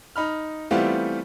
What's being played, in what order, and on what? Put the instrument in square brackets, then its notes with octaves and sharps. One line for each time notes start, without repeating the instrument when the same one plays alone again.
[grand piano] D#4 B5 F6
E3 G3 A3 B3 C4 F4